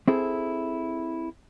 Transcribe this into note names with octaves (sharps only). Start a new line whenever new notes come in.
C4 E4 G#4 A4